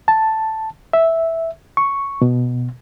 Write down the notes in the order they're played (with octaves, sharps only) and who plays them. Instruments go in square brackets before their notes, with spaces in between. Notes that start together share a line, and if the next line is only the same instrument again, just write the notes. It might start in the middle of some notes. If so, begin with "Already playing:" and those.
[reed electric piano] A5
E5
C#6
B2